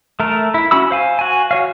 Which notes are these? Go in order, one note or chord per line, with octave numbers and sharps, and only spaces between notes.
A3 A#4
E4
C#4 F#4 B5 E6
C5 F5 G#5
F#4 G#5
F#4 C#5 F5